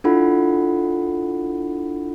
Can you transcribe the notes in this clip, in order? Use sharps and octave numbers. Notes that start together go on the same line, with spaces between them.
D4 E4 F4 A4 F#5 B5